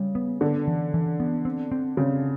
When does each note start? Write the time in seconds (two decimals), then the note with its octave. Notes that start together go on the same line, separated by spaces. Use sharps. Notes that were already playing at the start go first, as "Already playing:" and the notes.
Already playing: C#3 G3
0.15 B3
0.41 D3 B3
0.67 E3
0.94 E3
1.20 B3
1.45 C4
1.72 C4
1.97 C#3 C4